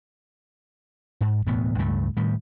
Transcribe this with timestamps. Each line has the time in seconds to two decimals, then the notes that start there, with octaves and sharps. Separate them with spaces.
1.21 G#2
1.46 E1 D2 A2 B3
1.78 C#2 G2 A3
2.17 A2 D#3 G3